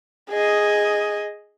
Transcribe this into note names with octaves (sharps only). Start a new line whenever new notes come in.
G#4 D#5